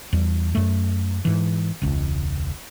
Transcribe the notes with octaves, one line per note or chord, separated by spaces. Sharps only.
E2 G3
F#2 A3
G#2 E3
E1 C#2